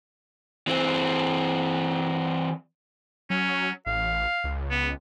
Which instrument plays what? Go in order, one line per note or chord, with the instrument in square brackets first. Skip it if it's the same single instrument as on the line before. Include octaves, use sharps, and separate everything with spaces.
[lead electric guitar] E3 C4
[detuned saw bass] F#3 [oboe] C#4
[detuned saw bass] A1 [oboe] F5
[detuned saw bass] C#2
[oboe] B3